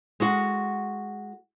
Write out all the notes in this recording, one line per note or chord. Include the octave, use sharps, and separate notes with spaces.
G#3 F#4